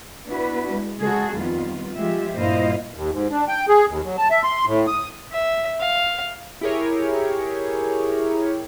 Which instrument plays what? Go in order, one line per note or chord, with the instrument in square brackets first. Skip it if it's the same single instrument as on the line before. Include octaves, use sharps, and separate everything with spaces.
[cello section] B3 D4 E4 F#4 B4
G#3
C#3 G#3 F#4 G#4 A4
F2 D#3 G3 B3 F4
F3 G#3 F4 G4 E5
G2 A#2 E4 C5 D#5 F5
[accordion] D#2
G#2
D4
G5
G#4
D#2
F#3
A5
E5
C6
A2
D#6
[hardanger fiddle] E5
F5
[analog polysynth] E4 G4 G#4 A#4 C#5